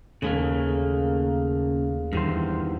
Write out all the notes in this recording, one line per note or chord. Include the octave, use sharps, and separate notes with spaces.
D#2 C#3 A3 A#3 G#4
E2 G2 D#3 C5